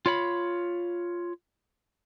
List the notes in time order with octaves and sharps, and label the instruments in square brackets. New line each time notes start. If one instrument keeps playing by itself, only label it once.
[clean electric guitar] F4 C#5 B5